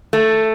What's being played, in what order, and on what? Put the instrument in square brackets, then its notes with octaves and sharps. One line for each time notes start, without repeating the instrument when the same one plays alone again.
[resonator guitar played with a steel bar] A3